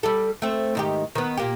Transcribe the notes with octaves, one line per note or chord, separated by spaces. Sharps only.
G3 G4 A4
A3 C4
G#2 D#3 G4
D#3 B3
A#2 A#3 G4